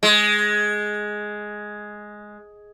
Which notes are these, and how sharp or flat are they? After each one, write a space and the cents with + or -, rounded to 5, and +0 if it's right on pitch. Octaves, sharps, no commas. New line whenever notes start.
G#3 +5